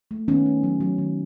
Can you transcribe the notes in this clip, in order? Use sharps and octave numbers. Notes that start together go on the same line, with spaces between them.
A3
D#3 B3 C#4
A3
F#3
F#3
D#3